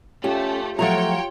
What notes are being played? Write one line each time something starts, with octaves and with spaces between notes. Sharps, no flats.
A3 C#4 F4 G4
F3 F#3 A3 F4 C#5 G5 A#5